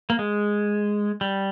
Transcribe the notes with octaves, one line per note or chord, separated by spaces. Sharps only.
A#3
G#3
G3